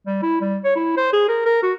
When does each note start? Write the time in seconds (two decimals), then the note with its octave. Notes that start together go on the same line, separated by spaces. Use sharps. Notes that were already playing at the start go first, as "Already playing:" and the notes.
0.07 G3
0.23 E4
0.41 G3
0.64 C#5
0.76 E4
0.97 C5
1.13 G#4
1.28 A#4
1.46 A#4
1.63 F#4